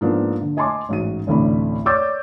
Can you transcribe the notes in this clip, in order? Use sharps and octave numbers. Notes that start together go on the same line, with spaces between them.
G#2 F3 A#3 B3 D4
D3
D#5 G#5 A5 C6 D6
A1 G#2 F#4 D#7
A1 D2 A2 C3 D5 B5
C#5 D5 D6 E6 G6 A6